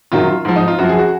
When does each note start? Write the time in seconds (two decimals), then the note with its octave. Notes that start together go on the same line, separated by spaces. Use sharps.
0.12 F#2 D#3 F#3 F4
0.45 G#2 F3
0.56 D#4
0.68 F4
0.78 F#2 F3 F#4
0.89 G#4
0.98 F#4